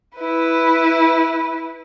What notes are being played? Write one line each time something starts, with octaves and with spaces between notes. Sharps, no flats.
E4 B4